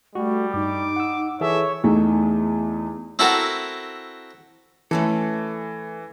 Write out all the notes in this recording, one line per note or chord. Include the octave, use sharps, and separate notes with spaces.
G3 A3 F#4
G2 D#4 D6
F#5 E6
E3 G#4 A4 C#5 E5
E2 A3 D#4
C4 E4 F#4 A4 A#4
E3 A3 C#4 A4